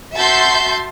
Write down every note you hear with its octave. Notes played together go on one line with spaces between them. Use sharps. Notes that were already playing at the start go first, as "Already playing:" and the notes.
F#4 E5 A5 C6 G6